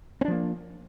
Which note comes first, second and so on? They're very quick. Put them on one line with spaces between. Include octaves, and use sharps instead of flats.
C4 D4 F3 A#3